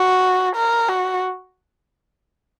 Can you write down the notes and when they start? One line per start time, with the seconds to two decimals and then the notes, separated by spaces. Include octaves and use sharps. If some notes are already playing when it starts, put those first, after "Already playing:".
Already playing: F#4
0.56 A#4
0.89 F#4